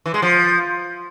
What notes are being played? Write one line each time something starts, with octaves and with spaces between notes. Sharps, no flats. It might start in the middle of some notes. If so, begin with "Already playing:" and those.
E3
G#3
F3